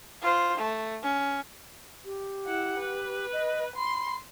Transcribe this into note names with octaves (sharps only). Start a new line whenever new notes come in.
F4 C5
A3
C#4
G4
E4 F#5
B4
D#5
B5 C6